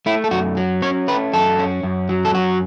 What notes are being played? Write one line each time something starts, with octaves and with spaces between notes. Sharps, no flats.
A3 E4
A4
F#2 F#4
F#3
C#4 C#5
A3 B4
F#2 A4
C#4
F#2
F#3
A4
F#2 F#4